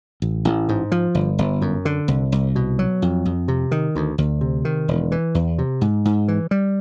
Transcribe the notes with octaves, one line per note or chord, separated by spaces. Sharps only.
A1
A1
G#2
F3
G1
G1
F#2
D3
C2
C2
B2
F#3
F2
F2
C3
D#3
D2
D2
C3
D#3
E1
E3
E2
C3
G#2
G#2
E3
G3